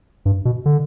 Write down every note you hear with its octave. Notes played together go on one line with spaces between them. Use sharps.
G2
B2
D3